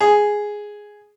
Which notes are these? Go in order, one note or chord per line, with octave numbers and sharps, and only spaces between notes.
G#4